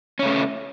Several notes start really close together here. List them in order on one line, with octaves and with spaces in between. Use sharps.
C#4 C#3 A3